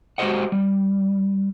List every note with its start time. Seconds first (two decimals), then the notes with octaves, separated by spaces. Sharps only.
0.18 G#3 F#4 G4 C5 D#5 F#5
0.52 G3